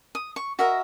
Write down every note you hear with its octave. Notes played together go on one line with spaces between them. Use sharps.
D#6
C#6
F#4 A#4 D#5 E5